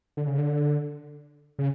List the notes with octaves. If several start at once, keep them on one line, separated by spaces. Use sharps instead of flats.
D3
C#3
D3
C#3